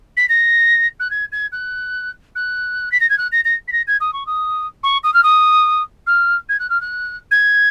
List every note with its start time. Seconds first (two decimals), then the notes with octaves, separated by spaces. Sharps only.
0.17 B6
0.29 A#6
1.00 F#6
1.11 G#6
1.32 G#6
1.52 F#6
2.35 F#6
2.92 B6
3.01 A#6
3.10 G#6
3.18 F#6
3.32 A#6
3.45 A#6
3.68 B6
3.72 A#6
3.87 G#6
4.00 D#6
4.13 C#6
4.27 D#6
4.83 C#6
5.04 D#6
5.14 F6
5.23 D#6
6.07 F6
6.49 G#6
6.59 F#6
6.70 F6
6.81 F#6
7.31 G#6